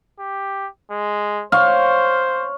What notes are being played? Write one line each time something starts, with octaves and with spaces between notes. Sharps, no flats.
G4
G#3
C5 C#5 F5